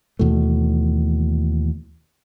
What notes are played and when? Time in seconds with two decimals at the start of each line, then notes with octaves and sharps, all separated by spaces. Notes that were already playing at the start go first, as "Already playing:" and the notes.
0.19 D#2 B2 E3 A3